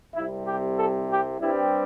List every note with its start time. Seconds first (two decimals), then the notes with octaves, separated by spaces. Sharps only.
0.14 C2 C3 G3 E4
0.45 G4
0.77 A4
1.09 G4
1.40 G2 G3 C4 E4